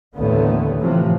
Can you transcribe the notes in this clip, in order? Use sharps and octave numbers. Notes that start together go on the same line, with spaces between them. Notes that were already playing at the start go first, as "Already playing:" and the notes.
A1 D#2 D3 A3 B3
A2 C3 E3 F3